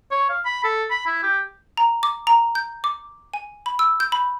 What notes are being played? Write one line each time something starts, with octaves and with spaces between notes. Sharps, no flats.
C#5
F5
B5
A4
B5
E4
G4
A#5
D6
A#5
G6
D6
G#5
B5
E6
G6
B5